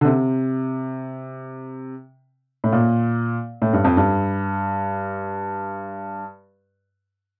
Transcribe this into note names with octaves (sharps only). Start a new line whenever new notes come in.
D3
C3
A2
A#2
A2
G2
F2
G2